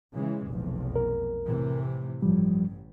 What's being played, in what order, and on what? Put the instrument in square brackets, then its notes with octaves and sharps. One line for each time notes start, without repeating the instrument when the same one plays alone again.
[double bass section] C#3 E3 G#3
F1 B1 E2
[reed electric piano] A#4
[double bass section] A2 C3 E3
[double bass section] A1 G2 [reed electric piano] F3 G3